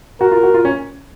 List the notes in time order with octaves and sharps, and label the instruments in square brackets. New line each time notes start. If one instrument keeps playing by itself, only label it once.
[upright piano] F#4 [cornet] A#4
[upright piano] F4
F#4
F4
C#4